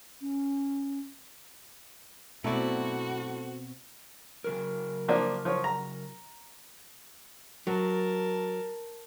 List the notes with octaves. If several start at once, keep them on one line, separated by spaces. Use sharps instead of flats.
C#4
B2 F#3 A3 C4 E4 F#4 D5
C#3 F#3 A#4
F3 A#3 D4
F3 C#5
A#5
F#3 A#4 A5